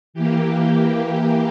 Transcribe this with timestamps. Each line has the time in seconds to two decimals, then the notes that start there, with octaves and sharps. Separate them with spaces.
0.14 E3 A#3 G4
1.06 G4